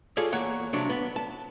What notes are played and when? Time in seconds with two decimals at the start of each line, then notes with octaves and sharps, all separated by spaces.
0.17 F4 G#4 A4 C#5 D5
0.33 E2 A#3 C#5 F#5
0.73 G2 C3 F#3 D4 C#5
0.90 B3
1.16 A5